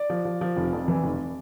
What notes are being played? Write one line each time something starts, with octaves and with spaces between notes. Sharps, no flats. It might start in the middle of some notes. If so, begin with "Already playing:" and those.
Already playing: D5
F3
F3
F3
F1
F2
E3
F1